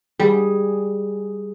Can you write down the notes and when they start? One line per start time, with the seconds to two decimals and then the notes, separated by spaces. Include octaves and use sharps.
0.20 G3 G#4